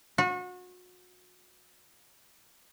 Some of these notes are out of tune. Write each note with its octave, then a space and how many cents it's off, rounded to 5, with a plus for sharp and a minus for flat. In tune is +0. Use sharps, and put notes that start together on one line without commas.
F#4 -35